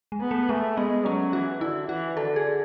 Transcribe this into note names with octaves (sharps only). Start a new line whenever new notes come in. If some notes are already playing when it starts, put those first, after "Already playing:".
G#3
B3
A3
G#3 A3
G#3 B3
F#3 C#4
E3 F#4
D3 E4
E3 F#4
D3 A4
G#4